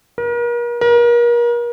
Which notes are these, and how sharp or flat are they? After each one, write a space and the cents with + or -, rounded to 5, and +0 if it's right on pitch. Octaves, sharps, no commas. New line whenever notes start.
A#4 +40
A#4 +35